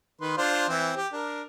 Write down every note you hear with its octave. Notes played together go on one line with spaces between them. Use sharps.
D#3 B4 C6
D4 F4 C5
E3 C4
G4
D4 A#4